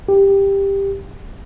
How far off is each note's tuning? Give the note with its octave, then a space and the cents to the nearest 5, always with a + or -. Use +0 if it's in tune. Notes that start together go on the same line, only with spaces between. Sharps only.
G4 +10